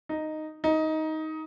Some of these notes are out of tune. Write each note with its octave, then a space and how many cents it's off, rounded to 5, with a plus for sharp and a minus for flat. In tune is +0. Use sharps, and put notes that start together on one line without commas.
D#4 -5
D#4 +15